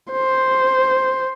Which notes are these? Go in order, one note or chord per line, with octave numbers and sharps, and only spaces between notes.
C5